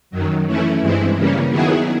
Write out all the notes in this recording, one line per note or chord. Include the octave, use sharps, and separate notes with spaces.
F#2 D#3 F#3
E3 A3 C#4 E4
G2 E3 G#3 C4 E4
C#3 E3 G3 A#3 C#4
D#3 F#3 B3 E4 G#4